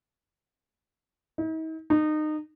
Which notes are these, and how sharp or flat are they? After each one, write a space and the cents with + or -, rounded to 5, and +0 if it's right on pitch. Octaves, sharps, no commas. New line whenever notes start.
D#4 +45
D#4 -25